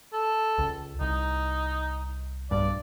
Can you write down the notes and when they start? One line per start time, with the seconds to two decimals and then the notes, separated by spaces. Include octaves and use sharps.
0.13 A4
0.58 C#2
1.00 C2 D#4
2.51 B1 G2 D5